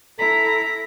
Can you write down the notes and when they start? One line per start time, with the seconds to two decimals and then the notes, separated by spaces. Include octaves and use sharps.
0.19 E4 A4 A#5 B6